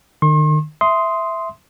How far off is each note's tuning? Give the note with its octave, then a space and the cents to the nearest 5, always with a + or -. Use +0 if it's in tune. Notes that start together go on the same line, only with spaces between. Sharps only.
D#3 -40 C6 +45
E5 +0 C6 -5 D#6 +10